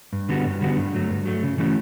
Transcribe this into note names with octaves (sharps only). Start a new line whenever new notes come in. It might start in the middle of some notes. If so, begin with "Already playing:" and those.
G2
D3 G3 B3 F#4
G2
D3 G3 B3 F#4
G2
F#3 A3
G2
F#3 A3
C#3
E3 A3 C#4 F#4